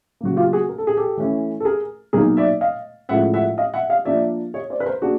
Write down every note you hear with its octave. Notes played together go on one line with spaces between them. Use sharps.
C#3 F#3 A#3 F#4
F4 G4
F#4 G#4
A#4
A4
G#4
G4 A4
E3 A3 C#4 E4
A4
G#4 A#4
B2 F#3 A#3 D#4 G#4 A#4
D5 E5
D#5 F5
A2 F3 G#3 C#4 E5 F#5
E5 F#5
D#5 F5
E5 F#5
D#5 F5
F3 A#3 D4 D5 E5
C#5 D#5
C5 D5
B4
A#4 C5
A#3 D4 F#4 G#4